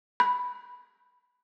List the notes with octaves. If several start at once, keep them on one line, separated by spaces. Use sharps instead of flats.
B5